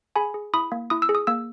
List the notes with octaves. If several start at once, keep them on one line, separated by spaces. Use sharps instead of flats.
G#4 G#5 B5
G#4
E4 B5 D#6
A#3
E4 D#6
E6
G#4
D#6
A#3 E6